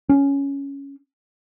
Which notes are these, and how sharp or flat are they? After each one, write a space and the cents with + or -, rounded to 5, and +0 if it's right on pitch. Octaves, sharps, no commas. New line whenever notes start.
C#4 +5